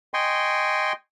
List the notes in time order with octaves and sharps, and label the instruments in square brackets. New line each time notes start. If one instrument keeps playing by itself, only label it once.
[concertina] D#5 G5 G#5 C6 C#6